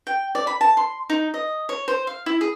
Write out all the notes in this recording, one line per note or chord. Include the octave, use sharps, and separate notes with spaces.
G5
D5
B5
A5
C6
D#4
D#5
C#5
C5
F5
E4
G#4